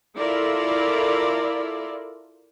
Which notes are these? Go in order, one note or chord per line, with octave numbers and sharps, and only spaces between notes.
E4 F4 A4 A#4 D5